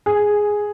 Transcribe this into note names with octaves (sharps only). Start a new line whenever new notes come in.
G#4